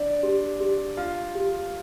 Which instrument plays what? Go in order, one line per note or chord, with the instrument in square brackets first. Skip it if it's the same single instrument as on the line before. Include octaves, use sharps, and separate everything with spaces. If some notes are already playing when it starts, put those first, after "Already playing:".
Already playing: [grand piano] D4 [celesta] D5
[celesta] G4
G4
[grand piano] F4 [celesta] F5
[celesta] G4